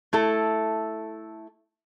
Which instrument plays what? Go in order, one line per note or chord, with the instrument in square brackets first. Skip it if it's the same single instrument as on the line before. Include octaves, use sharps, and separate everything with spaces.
[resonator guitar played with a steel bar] A3 E4 A4